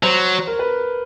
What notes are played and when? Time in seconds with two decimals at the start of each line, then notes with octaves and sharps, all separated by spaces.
0.03 F#3 C5
0.47 A#4
0.59 B4